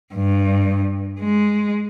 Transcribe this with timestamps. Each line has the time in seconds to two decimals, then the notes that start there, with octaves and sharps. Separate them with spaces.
0.14 G2
1.19 G#3